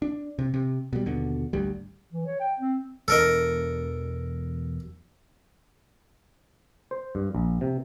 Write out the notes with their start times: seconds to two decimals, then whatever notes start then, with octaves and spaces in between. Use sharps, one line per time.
0.02 D4
0.39 C3
0.54 C3
0.93 B2 G3
1.05 D#2 B2 D3
1.53 G#1 D2 G3
2.13 E3
2.26 C#5
2.40 G5
2.59 C4
3.08 E1 E2 D4 A4 A#4 D#5
6.91 C5
7.15 G2
7.35 A#1
7.61 C3